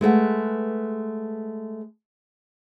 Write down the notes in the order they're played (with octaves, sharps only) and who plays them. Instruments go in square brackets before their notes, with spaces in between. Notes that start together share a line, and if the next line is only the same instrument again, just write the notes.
[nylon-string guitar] G#3 A3 B4 F#5